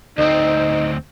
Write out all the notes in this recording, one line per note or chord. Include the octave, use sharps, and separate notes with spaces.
D2 C4 D#4